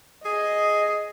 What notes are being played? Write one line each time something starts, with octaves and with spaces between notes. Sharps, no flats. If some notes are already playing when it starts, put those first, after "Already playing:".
G#4 D#5